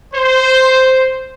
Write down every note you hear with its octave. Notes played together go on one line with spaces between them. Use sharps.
C5